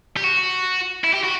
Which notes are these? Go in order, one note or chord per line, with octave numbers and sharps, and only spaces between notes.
G4
F#4
E4
G4
F#4